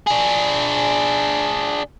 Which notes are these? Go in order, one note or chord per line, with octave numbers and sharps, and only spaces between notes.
D4 G#4